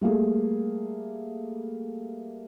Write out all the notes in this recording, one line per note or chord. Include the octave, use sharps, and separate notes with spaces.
G3 A3 A#3 G#4